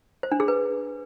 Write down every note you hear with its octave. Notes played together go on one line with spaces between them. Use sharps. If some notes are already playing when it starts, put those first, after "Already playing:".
C5
D4
G#4
B4